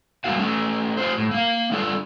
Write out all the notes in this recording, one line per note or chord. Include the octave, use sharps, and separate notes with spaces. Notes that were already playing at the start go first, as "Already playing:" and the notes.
G3 A#3 B3 D4 F#4 F5
A3 C#4
F4 G4 C5
A2
A#3 F5
G3 D4 F4 A4 D5